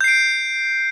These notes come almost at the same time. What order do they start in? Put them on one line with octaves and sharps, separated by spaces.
G6 C7 D7